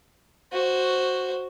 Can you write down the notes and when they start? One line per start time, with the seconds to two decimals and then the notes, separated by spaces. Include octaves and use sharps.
0.53 F#4 C5